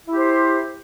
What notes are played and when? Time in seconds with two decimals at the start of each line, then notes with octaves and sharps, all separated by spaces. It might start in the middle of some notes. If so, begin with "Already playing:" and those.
0.07 E4
0.12 G4
0.17 C5